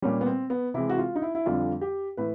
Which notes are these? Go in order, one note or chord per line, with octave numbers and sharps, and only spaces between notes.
A#2 G3 C#4
B3
C4
B3
C3 E3 G#3 E4
F#4
F4
D#4
E4
E4
F2 D3 G3 F4
G4
A2 E3 B4